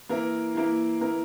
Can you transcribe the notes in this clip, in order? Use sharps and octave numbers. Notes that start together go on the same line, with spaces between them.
E3 A#3 E4 A#4
E3 A#3 E4 A#4
E3 A#3 E4 A#4